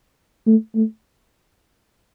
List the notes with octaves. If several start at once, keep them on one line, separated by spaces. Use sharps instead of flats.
A3
A3